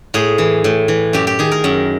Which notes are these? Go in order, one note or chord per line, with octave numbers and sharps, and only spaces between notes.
A2 G#4
E3
A2
E3
F#2 G4
G4
D#3 G#4
A#4
F#2